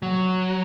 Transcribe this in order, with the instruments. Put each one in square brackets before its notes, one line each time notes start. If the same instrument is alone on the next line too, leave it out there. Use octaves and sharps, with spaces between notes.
[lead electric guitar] F#3